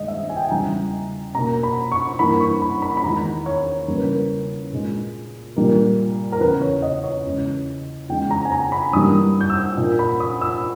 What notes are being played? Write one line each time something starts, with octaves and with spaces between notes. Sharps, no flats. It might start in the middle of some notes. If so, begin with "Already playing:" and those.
Already playing: G2 D#3 G#3 D#5
E5
G#5
G5
G#5
E2 C#3 E3 G3 A#5
B2 A#3 A#5
B5
C#6
G2 E3 A#3 B5
C#6
B5
B5
B5
E2 D#3 G#3 A#5
C#5
E2 C#3 G3 A#3 A#4
B4
A#4
A#2 G#3
A#2 G3 A#3
A#4
E2 C#3 E3 B4
C#5
D#5
C#5
E2 C#3 G#3
E2 C#3 G#3 G5
A#5
G#5
A#5
B5
G2 E3 G3 A#3 D#6
G6
E6
A#2 A#3
B5
D#6
E6